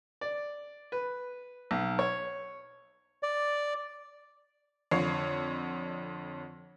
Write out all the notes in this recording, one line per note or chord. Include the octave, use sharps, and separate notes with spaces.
D5
B4
B1
C#5
D5
F2 D3 C#5 C7